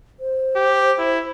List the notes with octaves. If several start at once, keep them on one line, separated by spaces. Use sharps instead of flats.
C5
G4
E4